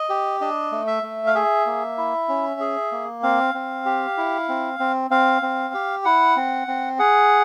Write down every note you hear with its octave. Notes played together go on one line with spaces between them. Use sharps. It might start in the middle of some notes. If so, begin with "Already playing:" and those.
Already playing: D#5
G4
D4 D#5
A3
E5
A3
F5
G#4 E5
A#3
E4
C#4
G#4
A#3
C4 F5
C4
G4
E4
C4
C4
C4 F5
C4
G4
E4 F#5
C4
C4
G#4 F#5